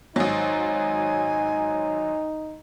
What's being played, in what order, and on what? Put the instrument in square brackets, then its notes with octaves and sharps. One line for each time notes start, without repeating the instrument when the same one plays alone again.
[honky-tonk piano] G#1 F#3 [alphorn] D#4 [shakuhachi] G#5